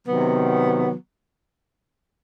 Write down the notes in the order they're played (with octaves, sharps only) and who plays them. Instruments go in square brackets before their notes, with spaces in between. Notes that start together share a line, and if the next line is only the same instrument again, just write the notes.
[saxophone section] C3 D#3 F#3 B3